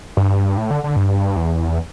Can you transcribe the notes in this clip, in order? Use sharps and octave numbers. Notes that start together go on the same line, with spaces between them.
G2
A2
D3
D3
G2
E2